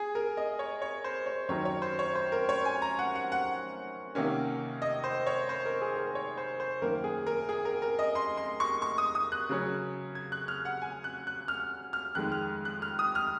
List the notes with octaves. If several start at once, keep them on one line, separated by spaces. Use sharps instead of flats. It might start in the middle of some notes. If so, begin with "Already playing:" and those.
Already playing: G#4
A#4
D#5
C#5
C#5
C5
C#5
F#2 D#3 F#3 C#4 C#5
C#5
C5
C#5
C5
A#4
C#5
G#5
A#5
F#5
F#5
F#5
C3 D#3 A#3 C#4
D#5
C5
C#5
C5
A#4
G#4
A#4
C#5
C5
C5
F#2 D#3 A#3 A#4
G#4
A#4
G#4
A#4
A#4
D#5
C6
C6
C#6
C#6
D#6
D#6
F#6
C#3 F#3 C#4
G#6
F#6
F6
F#5
G#5
F#6
F#6
F6
F6
F2 D#3 G#3 F#6
F6
F#6
F6
D#6
F6